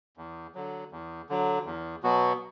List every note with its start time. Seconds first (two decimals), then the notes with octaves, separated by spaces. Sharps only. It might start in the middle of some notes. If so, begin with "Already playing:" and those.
0.17 E2
0.55 D3 F#3
0.92 E2
1.29 D3 F#3
1.66 E2
2.03 B2 F#3 B3 F#4